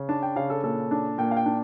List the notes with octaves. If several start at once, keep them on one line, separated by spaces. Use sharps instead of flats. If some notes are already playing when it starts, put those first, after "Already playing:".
Already playing: C#3
D4 A5
G5
C#3 F5
A4
A#2 A4
D4
A#2 G5
F5
G5
D4